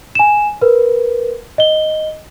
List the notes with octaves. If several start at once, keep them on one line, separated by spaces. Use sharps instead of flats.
G#5 E7
A#4 B4
D#5 G7